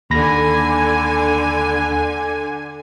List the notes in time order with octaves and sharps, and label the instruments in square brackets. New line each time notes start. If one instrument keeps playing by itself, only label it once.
[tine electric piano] D#2 B5 A#6 [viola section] D3 G#5